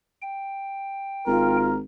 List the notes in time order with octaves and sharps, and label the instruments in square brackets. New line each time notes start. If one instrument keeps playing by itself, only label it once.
[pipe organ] G5
[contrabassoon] G#1 [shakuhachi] F4 [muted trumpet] A#4